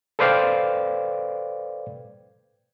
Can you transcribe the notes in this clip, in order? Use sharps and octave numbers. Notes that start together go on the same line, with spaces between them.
A4 B4 C5 D5 F5 G5